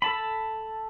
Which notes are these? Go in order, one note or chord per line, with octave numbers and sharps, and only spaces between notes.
A4 A5 B5